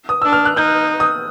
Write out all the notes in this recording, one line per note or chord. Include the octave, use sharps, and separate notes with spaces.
D#6
D4 E6
F6
F#6
D#4 G6
D#6